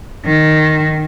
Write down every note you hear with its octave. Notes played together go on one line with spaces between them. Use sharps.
D#3